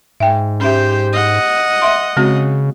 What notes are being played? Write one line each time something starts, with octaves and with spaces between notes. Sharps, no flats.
G#2 E5 G5
C#4 G4 C5 E5
D#5 F#5
E5 C6
C#3 G#3 C4 F#4